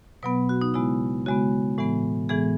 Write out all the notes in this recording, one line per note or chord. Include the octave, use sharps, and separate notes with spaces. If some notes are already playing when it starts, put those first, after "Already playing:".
B2 F#3 B3 B4
F#4
D#4
C#3 G#3 B3 E4
C#3 G#3 B3 F#4
A2 E3 G#3 B3
A2 E3 G#3 B3 G#4